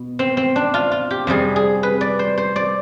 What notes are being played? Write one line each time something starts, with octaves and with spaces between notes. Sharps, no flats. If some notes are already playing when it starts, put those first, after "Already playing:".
Already playing: B2
C4
C4
D4
F4
F4
G4
F2 C3 G3 G#4
G#4
B4
D5
C5
C5
D5